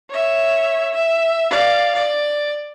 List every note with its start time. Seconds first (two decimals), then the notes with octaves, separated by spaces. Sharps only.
0.10 C#5 E5
0.94 E5
1.50 D5 F5
1.95 D5